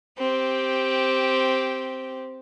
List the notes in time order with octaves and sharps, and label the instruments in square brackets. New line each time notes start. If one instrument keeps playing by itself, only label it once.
[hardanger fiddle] C4 G4